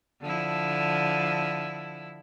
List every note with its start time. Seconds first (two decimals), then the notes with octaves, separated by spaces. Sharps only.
0.21 D3 F3 E4